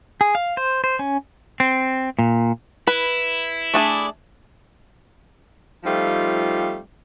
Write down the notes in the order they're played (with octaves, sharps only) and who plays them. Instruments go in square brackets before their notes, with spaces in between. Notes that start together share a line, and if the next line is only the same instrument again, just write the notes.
[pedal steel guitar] G#4
F5
C5
C5
C#4
[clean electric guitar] C4
A#2
[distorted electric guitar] E4 [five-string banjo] B4
[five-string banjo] A3 D4 G#4
[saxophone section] F3 G3 A3 C4 D#4 F4